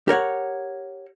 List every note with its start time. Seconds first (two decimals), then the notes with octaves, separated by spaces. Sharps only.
0.08 G4 A#4 C#5 F#5